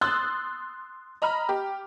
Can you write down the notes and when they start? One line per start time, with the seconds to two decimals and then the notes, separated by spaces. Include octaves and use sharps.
0.01 C6 D#6 E6 F#6 A6
1.22 D#5 A#5 B5 F6
1.49 G4